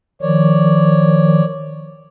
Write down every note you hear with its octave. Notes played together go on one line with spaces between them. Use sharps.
D#3 F3 C#5 D5